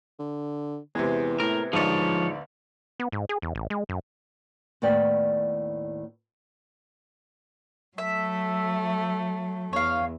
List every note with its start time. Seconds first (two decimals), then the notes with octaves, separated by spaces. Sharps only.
0.19 D3
0.95 E2 C3 G#3 B3
1.40 A2 A#4
1.73 A1 D2 G#2 F3 C#5 D5
3.00 B3
3.12 G#2
3.29 G#4
3.42 E2
3.55 A1
3.70 G#3
3.89 F#2
4.82 D#2 A2 B3 D5 G5
7.98 F#3 A3 E5
9.73 E2 C#5 F5